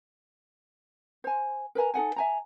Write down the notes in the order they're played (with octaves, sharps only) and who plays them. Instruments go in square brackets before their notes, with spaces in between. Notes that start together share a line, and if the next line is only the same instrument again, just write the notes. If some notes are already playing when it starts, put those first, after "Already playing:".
[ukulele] C5 G#5
A#4 B4 G#5 A#5
D#4 A4 F#5 G#5
E5 G#5 A#5